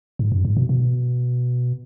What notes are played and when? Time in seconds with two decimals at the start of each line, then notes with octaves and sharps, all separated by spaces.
0.19 G#2
0.32 F#2
0.45 G#2
0.57 B2
0.69 B2